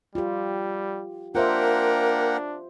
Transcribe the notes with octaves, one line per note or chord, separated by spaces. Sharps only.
G3 F4 G4
A#3 D4 F4 A#4 C5 E5 F#5 G5